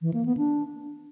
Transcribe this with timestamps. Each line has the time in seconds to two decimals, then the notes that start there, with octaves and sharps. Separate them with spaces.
0.02 E3
0.14 A#3
0.25 B3
0.37 D4